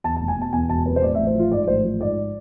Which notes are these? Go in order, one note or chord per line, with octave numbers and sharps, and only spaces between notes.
E2 A5
A5
F1
G#5
B2
A5
E2 G#5
E1 A5
C3 B4
C5
A2 D5
E5
A1
C5
F3 F4
G#2 D5
A1 C5
F3
G#2 D5